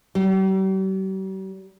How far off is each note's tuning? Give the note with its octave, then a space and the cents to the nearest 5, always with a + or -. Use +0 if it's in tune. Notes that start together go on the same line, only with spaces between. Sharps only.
G3 -45